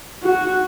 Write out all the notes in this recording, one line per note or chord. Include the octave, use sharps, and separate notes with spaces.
F#4